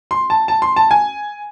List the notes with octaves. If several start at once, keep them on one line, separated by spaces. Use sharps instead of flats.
C6
A5
A5
C6
A5
G#5